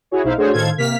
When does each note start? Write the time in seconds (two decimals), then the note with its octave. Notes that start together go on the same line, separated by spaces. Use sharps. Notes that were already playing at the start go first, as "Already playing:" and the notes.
0.11 E4 F#4 G#4 C#5
0.24 B1 D#4 E4 C5 F5
0.37 A3 D4 F#4 G#4 C5 C#5
0.53 A2 D#3 A4 C5 F5 G#6
0.78 C3 A#3 F6 B6